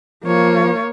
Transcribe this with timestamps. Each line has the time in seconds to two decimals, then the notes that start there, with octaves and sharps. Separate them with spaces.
0.25 F3 A#3 C#5